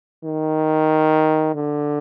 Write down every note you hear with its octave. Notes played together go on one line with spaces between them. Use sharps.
D#3
D3